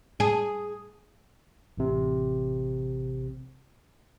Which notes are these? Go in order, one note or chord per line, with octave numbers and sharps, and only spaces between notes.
G#4
A1 C3